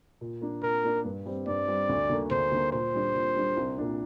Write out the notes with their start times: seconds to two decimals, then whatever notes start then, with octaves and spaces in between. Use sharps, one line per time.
0.21 A#2
0.41 A#3 D4
0.63 A#2 A#4
0.84 A#3 D4
1.05 G2
1.25 G3 C4
1.47 G2 D5
1.68 G3 C4
1.89 D2
2.09 D3 A#3
2.31 D2 C5
2.52 D3 A#3
2.73 A#2 C5
2.94 G3 D4
3.15 A#2
3.36 G3 D4
3.57 C2
3.78 A#2 A#3 D4